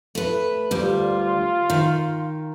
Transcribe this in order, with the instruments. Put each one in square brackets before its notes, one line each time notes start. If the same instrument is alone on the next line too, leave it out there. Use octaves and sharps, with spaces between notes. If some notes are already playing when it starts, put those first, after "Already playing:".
[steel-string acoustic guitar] A3 B4
[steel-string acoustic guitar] D2 G3 [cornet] F4
[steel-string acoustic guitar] D#3